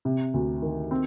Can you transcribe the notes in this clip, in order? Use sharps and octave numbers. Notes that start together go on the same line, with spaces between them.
C3
D2
D#3
C4